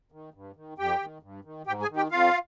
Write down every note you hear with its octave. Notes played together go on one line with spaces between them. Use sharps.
D#3
G2
D#3
F2 G4 G5
D#3
G2
D#3
G#2 G4 G5
G#4 G#5
D#3
G4 G5
F2 F4 F5